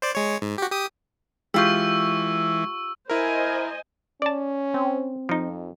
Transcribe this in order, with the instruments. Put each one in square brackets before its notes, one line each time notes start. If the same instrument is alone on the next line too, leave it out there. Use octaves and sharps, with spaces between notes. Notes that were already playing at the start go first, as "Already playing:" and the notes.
[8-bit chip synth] C5 D5
G#3 C#5
G#2
F#4 G4
G4 D#6
[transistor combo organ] E3 [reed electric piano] G#3 G6 [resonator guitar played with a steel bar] F4 G4 [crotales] C#6 E6
[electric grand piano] E4 A#4 [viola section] C5 D#5 G#5
[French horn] C#4 [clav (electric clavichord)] D5 A5
[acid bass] C4
[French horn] F2 [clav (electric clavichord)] F3 D#4